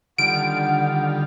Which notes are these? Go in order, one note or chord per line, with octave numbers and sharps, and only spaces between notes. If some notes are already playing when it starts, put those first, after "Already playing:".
D3 D#3 G3 F4 F#5 D7